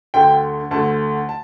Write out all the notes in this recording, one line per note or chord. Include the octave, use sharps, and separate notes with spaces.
D2 D3 A3 G5
D2 D3 A3 A5
A5